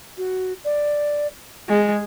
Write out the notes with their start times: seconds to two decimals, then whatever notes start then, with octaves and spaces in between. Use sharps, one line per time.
0.17 F#4
0.65 D5
1.69 G#3 G#4